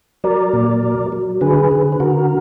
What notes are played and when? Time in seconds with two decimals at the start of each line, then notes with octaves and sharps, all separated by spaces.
0.24 F#3 A#4 D5
0.53 A#2
0.83 F#3
1.12 F#3
1.41 D3 G#4 B4
1.71 D3
1.92 B4
2.00 D3 F#4 A#4